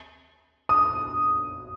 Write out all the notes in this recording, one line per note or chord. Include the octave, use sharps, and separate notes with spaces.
D#6